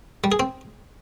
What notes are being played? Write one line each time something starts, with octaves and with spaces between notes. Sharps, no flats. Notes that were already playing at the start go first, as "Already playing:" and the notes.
G3
G#4
C4